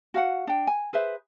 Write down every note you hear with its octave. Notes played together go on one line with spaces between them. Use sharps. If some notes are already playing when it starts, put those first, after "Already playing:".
F#4 F5 F#5
D4 G5
G#5
G#4 B4 C5 E5